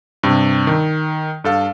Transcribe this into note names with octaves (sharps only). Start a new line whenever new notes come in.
G2 C3
D#3
G2 A4 F5